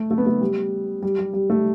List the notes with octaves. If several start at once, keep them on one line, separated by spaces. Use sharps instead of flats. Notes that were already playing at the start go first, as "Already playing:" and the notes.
Already playing: A3
A3
B3
A3
G3
G3
G3
G3
A3